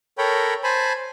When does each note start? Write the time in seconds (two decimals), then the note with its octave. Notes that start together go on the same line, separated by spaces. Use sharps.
0.18 A4 A#4 C#5 G5 A#5 B5
0.63 C5 G#5 A5 B5